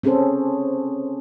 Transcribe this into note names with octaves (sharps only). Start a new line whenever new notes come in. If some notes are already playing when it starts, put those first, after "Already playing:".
C4 C#4 G#4 A4 C5